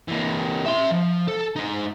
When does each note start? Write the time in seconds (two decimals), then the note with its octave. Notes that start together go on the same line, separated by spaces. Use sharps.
0.08 E3 A#3
0.66 E5 C6
0.92 F3
1.28 A4
1.56 G#3 D#4